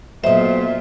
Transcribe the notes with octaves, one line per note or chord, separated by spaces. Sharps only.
B1 A#2 C5 D#5 E5